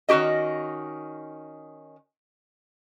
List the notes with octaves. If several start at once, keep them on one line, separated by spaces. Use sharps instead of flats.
D#3 C#4 F#4 G4 D#5